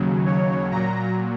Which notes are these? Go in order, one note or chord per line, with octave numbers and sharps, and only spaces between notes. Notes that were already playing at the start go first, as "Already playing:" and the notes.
Already playing: D#2 C#3 F#3
C#5
A#2 F#3 A#5